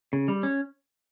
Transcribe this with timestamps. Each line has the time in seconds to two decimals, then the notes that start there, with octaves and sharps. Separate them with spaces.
0.13 C#3
0.28 G3
0.43 C#4